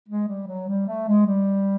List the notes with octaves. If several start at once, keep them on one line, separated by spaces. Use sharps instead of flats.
G#3
G3
F#3
G3
A3
G#3
G3